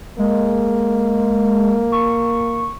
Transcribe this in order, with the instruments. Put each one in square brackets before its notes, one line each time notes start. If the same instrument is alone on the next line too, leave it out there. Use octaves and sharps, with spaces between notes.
[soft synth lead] G#3 [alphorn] A#3
[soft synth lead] C#6